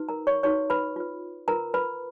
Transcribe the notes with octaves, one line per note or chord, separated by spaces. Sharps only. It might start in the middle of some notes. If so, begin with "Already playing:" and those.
Already playing: D#4 F#4 B4
A#4 A#5
C#5 C#6
D#4 F#4 B4 C#5 C#6
B4 B5
F4 B4
F4 A#4 B4 A#5
B4 B5